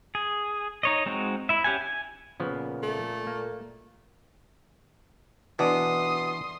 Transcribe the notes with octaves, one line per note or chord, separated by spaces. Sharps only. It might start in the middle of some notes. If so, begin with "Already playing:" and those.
G#4
D#4 C#5 D#5
G#3 C4 D#4 F#4
E4 E5
C#4 G4 F#5 G#5
G#5
A#2 C#3 F3 B3
A3
A#3
B2 E3 D4 C6 D#6